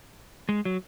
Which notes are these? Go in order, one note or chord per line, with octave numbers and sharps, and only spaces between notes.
G#3
F#3